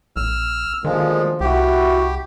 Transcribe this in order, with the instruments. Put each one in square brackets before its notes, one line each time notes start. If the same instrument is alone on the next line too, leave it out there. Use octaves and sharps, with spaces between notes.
[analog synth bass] A#1 [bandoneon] E6 F6
[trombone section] D2 A#2 F3 [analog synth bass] D#3 [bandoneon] G#3
[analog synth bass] C2 [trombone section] E4 F#4 [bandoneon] G4